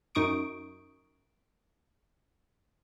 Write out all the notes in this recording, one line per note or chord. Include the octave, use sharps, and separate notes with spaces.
F#2 D#4 C#6 D#6 D7